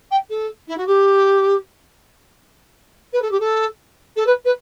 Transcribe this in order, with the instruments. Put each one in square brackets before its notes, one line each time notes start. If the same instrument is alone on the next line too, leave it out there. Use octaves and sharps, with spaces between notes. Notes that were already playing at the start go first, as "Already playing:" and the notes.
[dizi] G5
A4
E4
F#4
G4
B4
A4
G4
A4
A4
B4
B4